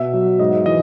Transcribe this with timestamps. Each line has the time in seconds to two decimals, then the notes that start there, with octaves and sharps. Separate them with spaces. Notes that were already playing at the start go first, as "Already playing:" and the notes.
Already playing: B2 E5
0.14 F#3
0.39 G#2 D#5
0.66 E3 D#5